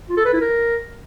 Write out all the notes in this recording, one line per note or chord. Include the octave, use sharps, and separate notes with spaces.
F4
A4
B4
E4
A#4